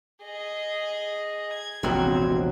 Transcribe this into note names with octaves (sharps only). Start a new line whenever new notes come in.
G#4 D#5
G#6
E1 A#1 C3 F#3 C4